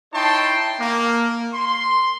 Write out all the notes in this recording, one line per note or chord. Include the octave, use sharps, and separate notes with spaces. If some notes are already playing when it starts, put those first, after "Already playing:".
D#4 E4 C#5 G5 A5 C6
A#3
C6